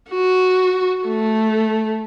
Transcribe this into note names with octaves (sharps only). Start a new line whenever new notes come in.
F#4
A3